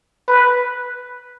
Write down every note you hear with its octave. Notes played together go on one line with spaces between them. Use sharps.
B4